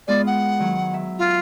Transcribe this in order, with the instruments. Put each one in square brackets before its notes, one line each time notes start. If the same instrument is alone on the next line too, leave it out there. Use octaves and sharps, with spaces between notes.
[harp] G#3 B3 F4 [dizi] D5
[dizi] F#5
[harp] D#3 F#3
E5
[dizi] F4